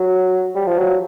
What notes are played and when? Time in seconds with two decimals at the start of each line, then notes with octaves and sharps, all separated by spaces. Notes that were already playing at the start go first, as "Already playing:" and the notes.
Already playing: F#3
0.55 G3
0.67 F3
0.78 F#3